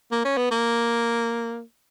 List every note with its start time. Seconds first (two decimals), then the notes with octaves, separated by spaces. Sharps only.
0.11 A#3
0.25 C#4
0.37 B3
0.51 A#3